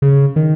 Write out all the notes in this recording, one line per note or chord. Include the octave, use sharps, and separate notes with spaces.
C#3
D#3